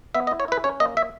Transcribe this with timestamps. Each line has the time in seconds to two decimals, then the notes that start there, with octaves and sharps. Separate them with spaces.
0.14 B3 E5
0.27 D#5
0.31 E4
0.40 C#5
0.48 E4 B4
0.64 C#4 C#5
0.80 A#3 D#5
0.97 E5